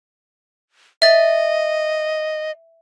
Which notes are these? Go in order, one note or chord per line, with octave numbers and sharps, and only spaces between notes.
D#5 E5 A6